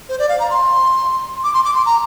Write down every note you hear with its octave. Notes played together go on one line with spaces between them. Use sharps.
C5
D5
F5
A#5
C6
D6
C6
D6
C6
A#5